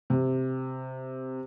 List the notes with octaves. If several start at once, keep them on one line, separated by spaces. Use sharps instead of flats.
C3